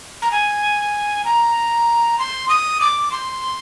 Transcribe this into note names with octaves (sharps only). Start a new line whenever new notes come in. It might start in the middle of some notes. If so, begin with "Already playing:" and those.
A#5
G#5
A#5
C6
D#6
D6
C6